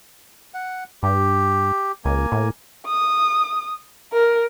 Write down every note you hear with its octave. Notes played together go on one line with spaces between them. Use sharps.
F#5
G2 G4
C#2 A#3 G#5
A2
D#6
A#4